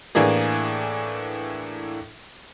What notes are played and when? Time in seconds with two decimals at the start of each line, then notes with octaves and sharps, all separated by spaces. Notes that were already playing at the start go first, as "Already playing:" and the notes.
0.15 A2 E3 A#3 D4 G#4